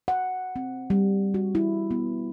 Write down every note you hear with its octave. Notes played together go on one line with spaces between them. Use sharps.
F#5
C4
G3
F#4
E4
B3